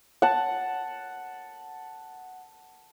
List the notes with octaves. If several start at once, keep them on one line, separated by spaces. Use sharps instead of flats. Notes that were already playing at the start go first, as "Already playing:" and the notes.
F#5 A5